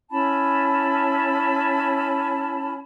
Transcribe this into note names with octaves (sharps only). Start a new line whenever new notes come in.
C#4 E4 A5 B5